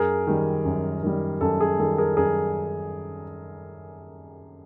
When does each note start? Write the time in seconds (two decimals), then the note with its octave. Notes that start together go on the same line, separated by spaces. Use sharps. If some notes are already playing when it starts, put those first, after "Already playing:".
Already playing: F#2 G#4 A#4
0.27 D#3 G3
0.65 F#2
1.03 D#3 G3
1.41 F#2 A4
1.61 G#4
1.79 D#3 G3 A4
1.98 G#4 A#4
2.17 F#2 G#4 A#4